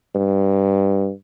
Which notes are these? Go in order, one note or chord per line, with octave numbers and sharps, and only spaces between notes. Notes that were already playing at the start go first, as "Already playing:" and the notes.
G2